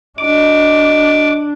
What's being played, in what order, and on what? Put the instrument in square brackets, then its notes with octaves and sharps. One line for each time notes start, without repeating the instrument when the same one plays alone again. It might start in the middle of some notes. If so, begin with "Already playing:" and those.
[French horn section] G3 F#4 D#5 [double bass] D4 [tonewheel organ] D6